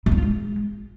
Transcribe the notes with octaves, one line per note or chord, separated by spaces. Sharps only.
G3
E4
F4
G#3